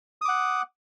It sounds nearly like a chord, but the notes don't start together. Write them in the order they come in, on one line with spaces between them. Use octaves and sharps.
D#6 D6 F#5